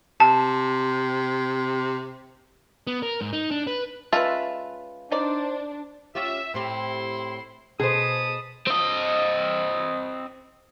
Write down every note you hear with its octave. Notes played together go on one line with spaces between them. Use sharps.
C3 A5
B3
A#4
G#2
D#4
D4
B4
G#3 C#4 F4 B4 E5 A5
D4 D#4 C5 D5
C#4 F4 G4 E5
A2 C4 E4 G4 C6
B2 G#4 C5 A5 B5 D#6
C4 D#5